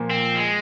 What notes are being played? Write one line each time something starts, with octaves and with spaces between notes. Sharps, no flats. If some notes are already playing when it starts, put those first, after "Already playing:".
Already playing: A#2 F3 A#3
C4
G#3